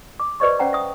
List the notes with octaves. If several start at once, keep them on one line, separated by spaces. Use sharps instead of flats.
D6
G4 B4 C5 D5 D#5 C#6
C#4 C5 F#5 G5 A#5
E5 D#6